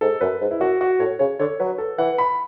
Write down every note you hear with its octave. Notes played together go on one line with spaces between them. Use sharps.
G#2 A4
F#2 B4
G#2
E4
F#2 F#4
F#4
A2 C#5
C#3 C#5
D3 C#5
F#3 B4
A4
E3 F#5
B5